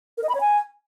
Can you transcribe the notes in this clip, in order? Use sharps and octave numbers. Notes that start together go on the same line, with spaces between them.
A#4
D#5
B5
C#5
G#5